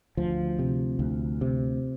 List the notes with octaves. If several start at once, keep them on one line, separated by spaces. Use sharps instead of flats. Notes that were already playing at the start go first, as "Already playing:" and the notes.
D2 F3
C3
D2
C3